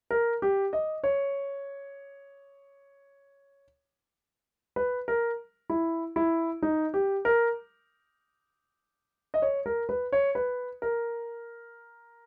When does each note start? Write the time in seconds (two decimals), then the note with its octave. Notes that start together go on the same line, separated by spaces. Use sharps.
0.11 A#4
0.42 G4
0.73 D#5
1.04 C#5
4.76 B4
5.08 A#4
5.70 E4
6.16 E4
6.62 D#4
6.94 G4
7.25 A#4
9.34 D#5
9.42 C#5
9.66 A#4
9.89 B4
10.13 C#5
10.35 B4
10.82 A#4